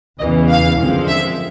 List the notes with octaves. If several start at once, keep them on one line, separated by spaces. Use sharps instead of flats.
E2 C#3 E3 D#5
F5
F#2 D3 F3 G#3 C4
E5